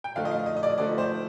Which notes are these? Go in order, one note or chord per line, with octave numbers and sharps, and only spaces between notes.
G5
D3 F3 A3 D#4 F5
D#5
F5
D#5
D#5
D5
D3 F3 A3 D#4 D5
C5